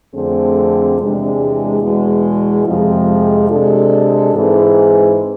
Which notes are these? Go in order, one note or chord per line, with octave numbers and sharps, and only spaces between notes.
F2 D3 A3 C4 G#4
E2 C3 G#3 D4
E2 B2 G#3
F2 C3 F3 G#3
C3 G#3 D4 A4
G#2 E3 G#3 C4 G#4